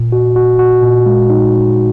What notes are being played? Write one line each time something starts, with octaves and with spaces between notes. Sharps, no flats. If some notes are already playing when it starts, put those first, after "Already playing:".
Already playing: A#2
F#4
F#4
F#4
A#2
G#3
D#4